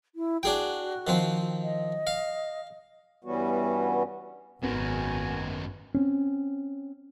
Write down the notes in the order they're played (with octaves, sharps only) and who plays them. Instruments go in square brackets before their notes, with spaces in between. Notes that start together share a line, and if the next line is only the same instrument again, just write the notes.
[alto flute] E4
[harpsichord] D4 G#4 G5 [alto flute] F#4
[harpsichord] D#3 F3 C4
[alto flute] D#5
[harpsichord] F5
[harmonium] G2 E3 G3 B3 C#4 F#4
[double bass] G#1 [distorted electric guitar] F#2 D#3 [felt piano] B3 [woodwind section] F#4 G#5
[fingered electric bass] C4 C#4